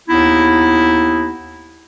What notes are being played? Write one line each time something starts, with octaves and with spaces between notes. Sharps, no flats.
D#2 B3 D#4 E4